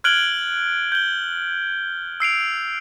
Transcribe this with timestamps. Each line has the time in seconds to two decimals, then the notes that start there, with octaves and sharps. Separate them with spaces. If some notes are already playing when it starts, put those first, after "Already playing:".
0.04 F6 F#6 G#6 D7 F#7 G7
0.92 G6 G7
2.20 E6 C7 D7 F7